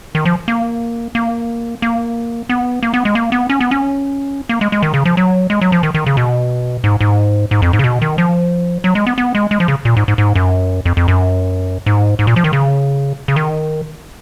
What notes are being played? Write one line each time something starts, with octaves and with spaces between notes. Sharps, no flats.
D#3
F3
A#3
A#3
A#3
B3
A#3
B3
G#3
A#3
B3
C#4
B3
C#4
A#3
G#3
G#3
D#3
C#3
F3
F#3
G#3
F#3
F3
D#3
D#3
C#3
B2
G#2
G#2
G#2
F2
G#2
C#3
B2
D#3
F3
F#3
G#3
B3
B3
G#3
G#3
F3
C#3
A#2
G#2
G#2
G#2
F#2
F2
F2
F#2
G#2
G#2
A#2
F3
D#3
C#3
C#3
D#3